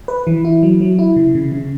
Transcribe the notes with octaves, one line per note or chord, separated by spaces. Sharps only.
B4
E3
E4
F#3
F#3
E4
C#3
C#3
C#3